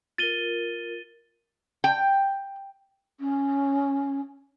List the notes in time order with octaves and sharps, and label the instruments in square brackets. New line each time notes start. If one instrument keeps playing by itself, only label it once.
[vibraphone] F4 A#4 [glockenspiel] A6 D#7 G7
[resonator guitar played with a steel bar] G5
[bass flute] C#4